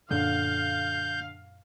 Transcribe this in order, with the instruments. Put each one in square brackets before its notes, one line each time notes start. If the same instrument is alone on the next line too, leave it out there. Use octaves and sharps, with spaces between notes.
[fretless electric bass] F#2 A#2 F#3 [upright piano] D3 [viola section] F5 [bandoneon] G6